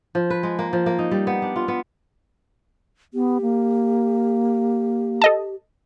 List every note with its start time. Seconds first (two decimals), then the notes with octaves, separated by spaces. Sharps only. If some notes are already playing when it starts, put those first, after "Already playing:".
0.15 F3
0.30 B4
0.43 G#3
0.59 A#3
0.73 F3
0.86 A#3
0.98 D#4
1.11 G3
1.27 B3
1.42 D4
1.56 F4
1.68 B3
3.14 B3 G4
3.42 A#3
5.22 A4 D#5 A5